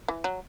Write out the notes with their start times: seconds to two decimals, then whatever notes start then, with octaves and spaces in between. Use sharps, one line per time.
0.08 E3
0.24 F#3